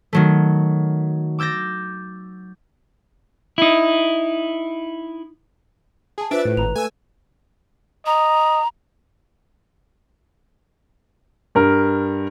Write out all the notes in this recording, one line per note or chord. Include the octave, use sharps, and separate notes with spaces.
D#3 F#3 A3
D6 E6 G6 A6 A#6
D#4 E4
G#4 G#5 A5
D4 F4 B4 C5 E5 A6 D7
A2
G#1 A#5 F7
A3 A4 G#5 E6
D#5 A#5
G2 A#4